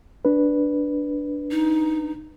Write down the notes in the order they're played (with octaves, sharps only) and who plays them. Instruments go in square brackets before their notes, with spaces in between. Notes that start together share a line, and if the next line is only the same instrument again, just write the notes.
[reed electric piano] D4 B4
[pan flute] D#4